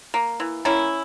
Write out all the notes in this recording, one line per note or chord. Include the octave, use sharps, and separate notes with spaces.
A#3
E3
A#3 C#4 E4